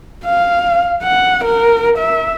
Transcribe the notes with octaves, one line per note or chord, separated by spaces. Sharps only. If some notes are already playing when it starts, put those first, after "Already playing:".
F5
F#5
A#4
E5